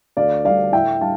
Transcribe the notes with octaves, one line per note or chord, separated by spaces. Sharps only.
D2 D5 F5
D3 G3 D4 D5 F5
A2 E5 G5
G3 D4 F5 A5